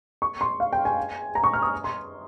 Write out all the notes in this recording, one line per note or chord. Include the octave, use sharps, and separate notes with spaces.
C#6
C6
F5
G5
G#5
A#5
C#6
F6
D#6
C6